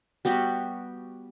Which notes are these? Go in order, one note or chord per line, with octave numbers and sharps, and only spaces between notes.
G3 B3 F#4 G4